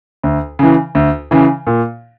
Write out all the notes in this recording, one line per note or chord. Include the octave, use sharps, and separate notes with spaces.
D2
C#3 E3
D2
C#3 E3
A#2